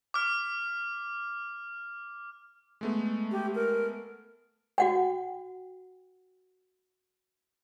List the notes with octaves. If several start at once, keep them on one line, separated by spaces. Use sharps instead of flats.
D6 F6
G#3 A3 B3
G4
A#4
F#4 F#5 G5